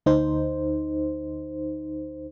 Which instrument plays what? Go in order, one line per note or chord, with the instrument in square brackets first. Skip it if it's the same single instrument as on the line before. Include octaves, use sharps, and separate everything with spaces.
[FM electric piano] D2 D#4 C5